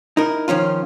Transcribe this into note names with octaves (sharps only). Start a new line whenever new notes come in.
D#4 E4 A#4
D#3 F3 C#4 F4